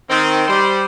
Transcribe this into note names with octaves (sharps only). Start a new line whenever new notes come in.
D#3 C4
G3 C5